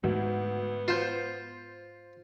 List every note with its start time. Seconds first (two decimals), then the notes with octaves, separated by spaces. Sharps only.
0.04 D2 G#2 B3
0.88 F4 C5 G6 E7